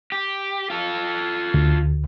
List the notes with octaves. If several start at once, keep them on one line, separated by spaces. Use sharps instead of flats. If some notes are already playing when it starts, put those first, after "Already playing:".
G4
F4 A4
D2